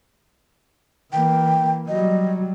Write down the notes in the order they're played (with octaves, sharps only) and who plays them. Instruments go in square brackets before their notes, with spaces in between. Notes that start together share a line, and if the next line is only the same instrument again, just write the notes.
[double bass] E3 A#3 [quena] G5
[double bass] F#3 G3 [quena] D#5